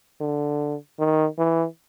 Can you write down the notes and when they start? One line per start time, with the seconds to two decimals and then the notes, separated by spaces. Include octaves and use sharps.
0.21 D3
0.99 D#3
1.39 E3